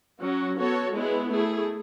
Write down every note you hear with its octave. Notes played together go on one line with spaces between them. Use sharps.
F#3 C#4 F#4
B3 F#4 A4 C#5
G#3 B3 E4 G#4
A3 E4 G#4